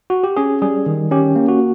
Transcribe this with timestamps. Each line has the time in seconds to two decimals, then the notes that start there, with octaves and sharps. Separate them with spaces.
0.10 F#4
0.24 G4
0.37 C#4 G#4
0.62 G3 G#4
0.86 D#3
1.11 C#4 G4
1.36 A#3
1.48 F#4